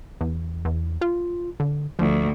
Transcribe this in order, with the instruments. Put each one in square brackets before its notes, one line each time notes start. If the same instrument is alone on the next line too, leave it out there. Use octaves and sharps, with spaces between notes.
[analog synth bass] E2
E2
F4
D3
[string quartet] D2 [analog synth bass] F3